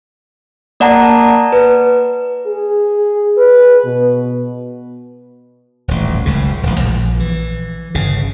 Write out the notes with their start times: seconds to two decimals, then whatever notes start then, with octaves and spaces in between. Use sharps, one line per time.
0.80 A#3 D5 F#5 A5 A#5
1.52 B4
2.47 G#4
3.38 B4
3.86 B2
5.88 D#1 A1
6.26 F#1 C#2 C#3
6.63 D#1 A1
6.80 A#1
7.20 E3
7.95 G1 C#3